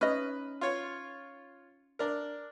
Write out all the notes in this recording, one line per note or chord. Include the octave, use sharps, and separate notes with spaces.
C#4 D#4 B4 D#5 F6
F4 C#5
D4 A#4